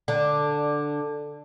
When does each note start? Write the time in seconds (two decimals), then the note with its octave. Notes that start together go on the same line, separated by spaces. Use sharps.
0.08 D3